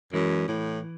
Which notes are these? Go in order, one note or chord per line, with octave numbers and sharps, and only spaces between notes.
F#2 E3 G#3
A2 E3